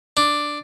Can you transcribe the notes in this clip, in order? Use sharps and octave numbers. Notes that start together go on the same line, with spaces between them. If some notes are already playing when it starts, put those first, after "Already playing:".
D4